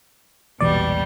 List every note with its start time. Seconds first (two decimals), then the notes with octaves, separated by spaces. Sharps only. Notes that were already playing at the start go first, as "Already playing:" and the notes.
0.61 E1 A#1 B2 E3 G3 D5